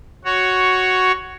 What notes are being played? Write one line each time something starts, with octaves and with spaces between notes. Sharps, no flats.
F#4 C#5